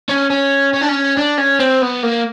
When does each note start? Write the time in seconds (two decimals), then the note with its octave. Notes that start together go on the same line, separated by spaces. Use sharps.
0.09 C#4
0.30 C#4
0.74 C#4
0.82 D4
0.89 C#4
1.17 D4
1.38 C#4
1.59 C4
1.82 B3
2.03 A#3